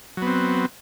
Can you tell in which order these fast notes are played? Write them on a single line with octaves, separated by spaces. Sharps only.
F#3 B3 C4